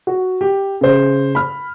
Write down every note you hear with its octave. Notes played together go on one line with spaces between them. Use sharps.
F#4
G4
C#3 C5
B5 F6